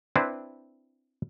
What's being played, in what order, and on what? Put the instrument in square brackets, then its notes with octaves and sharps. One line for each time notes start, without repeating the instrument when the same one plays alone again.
[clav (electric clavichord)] C4 D4 E4 B4